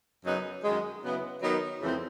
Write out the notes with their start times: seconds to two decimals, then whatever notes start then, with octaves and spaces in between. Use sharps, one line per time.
0.25 F#2 C#3 F#3 B3 D#4
0.65 F#2 D#3 G#3
1.03 C#3 F#3 B3 E4
1.42 D#3 F#3 B3 D#4
1.81 F2 C#3 E3 A3 C4